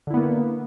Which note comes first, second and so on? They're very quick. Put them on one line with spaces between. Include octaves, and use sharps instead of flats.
D3 E4 B3 A#3